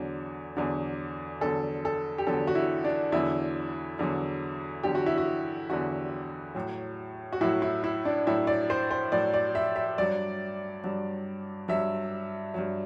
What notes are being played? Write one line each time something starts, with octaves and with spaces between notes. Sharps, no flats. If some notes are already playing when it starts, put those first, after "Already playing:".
Already playing: E2 D3 F#3
E2 D3 F#3
E2 D3 F#3 A4
A4
G4
E2 D3 F#3 A4
F#4
E4
D4
E2 D3 F#3 E4
E2 D3 F#3
E2 D3 F#3 G4
F#4
E4
F#4
E2 D3 F#3 F#4
A2 F#3
F#4
A2 F#3 E4
E4
E4
D4
A2 F#3 E4
D5
C5
C5
A2 F#3 D5
D5
E5
E5
G2 F#3 D5
G2 F#3
G2 F#3 E5
G2 F#3